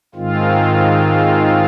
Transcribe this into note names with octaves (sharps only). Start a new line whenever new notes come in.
G#2 D#3 G#3 C4 F4